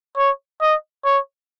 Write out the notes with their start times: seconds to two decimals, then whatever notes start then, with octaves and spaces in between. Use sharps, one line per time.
0.17 C#5
0.61 D#5
1.05 C#5